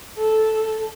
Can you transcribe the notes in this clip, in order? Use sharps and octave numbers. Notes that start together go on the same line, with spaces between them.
A4